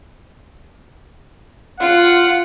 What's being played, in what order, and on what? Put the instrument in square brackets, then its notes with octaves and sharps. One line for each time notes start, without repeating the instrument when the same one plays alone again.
[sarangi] F4 [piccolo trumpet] F#5